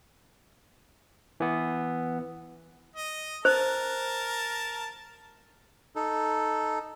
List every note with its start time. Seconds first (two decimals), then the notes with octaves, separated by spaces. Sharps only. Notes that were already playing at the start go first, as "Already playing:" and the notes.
1.40 E3 B3
2.96 D#5
3.45 A#4 C5 A5
5.96 D#4 A4